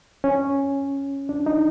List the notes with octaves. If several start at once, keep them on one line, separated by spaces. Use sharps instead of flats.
C#4
D4
D#4